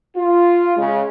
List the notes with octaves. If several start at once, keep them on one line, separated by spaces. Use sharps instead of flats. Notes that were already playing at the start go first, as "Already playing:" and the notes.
F4
C#3 G#3